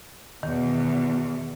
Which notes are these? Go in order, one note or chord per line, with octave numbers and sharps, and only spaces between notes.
E2 B2 D#3